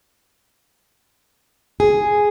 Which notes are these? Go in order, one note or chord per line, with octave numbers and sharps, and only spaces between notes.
G#4